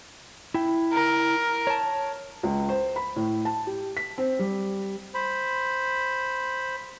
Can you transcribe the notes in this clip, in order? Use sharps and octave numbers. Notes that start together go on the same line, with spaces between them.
E4 G5
A#4
C#5 A5
C#2
C5
B5
A2
A5
G4
B6
C4
G3
C5 B5